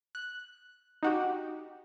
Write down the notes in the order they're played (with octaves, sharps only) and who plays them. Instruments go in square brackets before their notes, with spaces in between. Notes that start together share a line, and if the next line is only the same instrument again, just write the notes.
[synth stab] F#6
D#4 F#4 G4